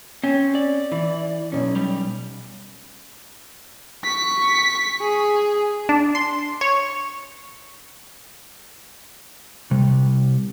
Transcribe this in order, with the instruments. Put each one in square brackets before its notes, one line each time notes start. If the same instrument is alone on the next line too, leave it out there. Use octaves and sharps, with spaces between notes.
[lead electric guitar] C4 [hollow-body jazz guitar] C#4
[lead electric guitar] D5
[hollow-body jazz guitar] E3
B1 F#2 C#4
[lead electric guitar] G3
[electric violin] C#6 B6
G#4
[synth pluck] D4
C6
C#5
[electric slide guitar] C3 G3